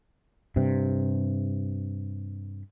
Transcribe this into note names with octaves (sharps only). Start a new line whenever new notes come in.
G2 C3